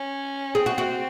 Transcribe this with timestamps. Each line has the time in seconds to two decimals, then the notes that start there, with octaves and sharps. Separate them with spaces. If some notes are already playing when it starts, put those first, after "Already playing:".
Already playing: C#4
0.55 C4 G#4
0.66 F#4
0.78 F#4